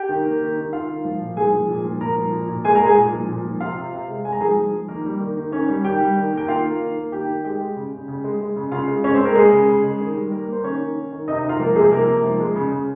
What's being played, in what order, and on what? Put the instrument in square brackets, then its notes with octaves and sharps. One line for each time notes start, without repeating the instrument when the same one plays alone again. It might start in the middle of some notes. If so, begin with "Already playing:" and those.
Already playing: [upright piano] G4 G5
D#3
A#3
D#3
D#3
D#3 F4 F5
D#3
F3
A#2
F3 G#4 G#5
F3
A#2
F3
A#2 A#4 A#5
F3
A#2
A#2
G#3 G#4 G#5
A#4 A#5
G#3
G#4 G#5
A#2
F3
A#2
F3
C3 F4 F5
C3
C3
G#3
G#3 G#5
A#5
F3 G#4 G#5
F3
F3
D#3 A#3 A#4
G3
D#3
D#3
D#3 C#4 C#5
G3
D#3 G4 G5
G3
D#3
A#3
G5
D#3 F4 F5
A#3
D#3
A#3
D#3 G4 G5
D#3
G#3 G4 G5
G#3
C#3
C#3
C#3
G#3
G#3
C#3
C#3 F4 F5
G#3
G#3 C#4 C#5
C4 C5
G#3
A#3 A#4
G#3 G#4
C#3
C#3
G#3
D#3
G3
A#3 A#4
A#3 C5
D#3 C#4 C#5
D#3
D#3
D#3
C3 D#4 D#5
D#4 D#5
C3
F4 F5
F3 A#3 A#4
C3 G#3 G#4
F3 A#3 A#4
C3
F3
G#3
C#3
C#3